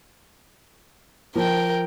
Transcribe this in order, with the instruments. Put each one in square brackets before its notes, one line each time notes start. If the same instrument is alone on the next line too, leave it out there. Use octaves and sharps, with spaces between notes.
[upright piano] F3 [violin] A#4 G5